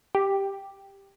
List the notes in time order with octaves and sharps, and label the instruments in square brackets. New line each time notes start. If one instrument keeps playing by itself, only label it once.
[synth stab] G4